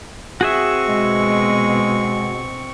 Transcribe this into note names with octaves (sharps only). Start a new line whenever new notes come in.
C4 F#4 G#4 E5 C#6
B2 G#3